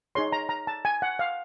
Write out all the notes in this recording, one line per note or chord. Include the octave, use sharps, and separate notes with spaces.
D#4 G#4 C#5 C6
A#5
A#5
A5
G#5
F#5
F5